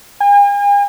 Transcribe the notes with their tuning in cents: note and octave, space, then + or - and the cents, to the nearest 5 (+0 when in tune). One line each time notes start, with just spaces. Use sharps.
G#5 -45